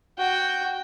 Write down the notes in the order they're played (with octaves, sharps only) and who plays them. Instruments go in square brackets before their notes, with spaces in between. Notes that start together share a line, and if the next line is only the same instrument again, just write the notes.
[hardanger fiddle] F#4 G5